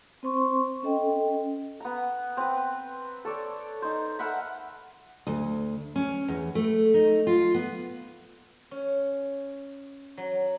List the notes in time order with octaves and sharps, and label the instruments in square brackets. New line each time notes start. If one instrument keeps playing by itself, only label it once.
[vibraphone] C4 C5 C6 C#6
C#4 A4 D#5 G5
[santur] B3 A#5
C4 B4
A4 C#5 D5
D#4 C5
A#4 E5 F#5 B5
[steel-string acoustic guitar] D2
C#4
E2
A3
D#4
F4
B3
[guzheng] C#4
F#3